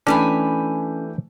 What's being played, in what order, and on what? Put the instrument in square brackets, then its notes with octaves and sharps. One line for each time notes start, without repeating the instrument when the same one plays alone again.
[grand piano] E3 A3 [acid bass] C#4 [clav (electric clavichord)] D4 [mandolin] G4 G#5 B5